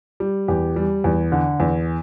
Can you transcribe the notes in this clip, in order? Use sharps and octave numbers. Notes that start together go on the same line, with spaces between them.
G3
E2 G4
G3
E2
D3
E2